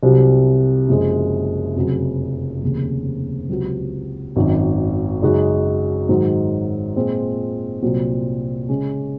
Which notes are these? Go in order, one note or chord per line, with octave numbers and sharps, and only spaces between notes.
C2 C3 F#3
F#1 F#2 F3 G#3
F1 F2 C#3 F#3
F1 D#2 C#3
C#2 C3 F#3
G#1 F#2 D#3
F#2 C#3 G#3 D#4 F#4
G#2 D#3 F#3
A#2 G#3 C4 F4 G#4
C2 A#2 F#3 C4
C#3 G#3 C#4